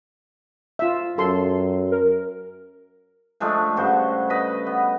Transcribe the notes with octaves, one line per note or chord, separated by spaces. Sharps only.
F4 E5
F#2 A4 C6
A#4
F3 G#3 A3 D4
G2 C#3 F#4 C5
B4 D#5 B5
B3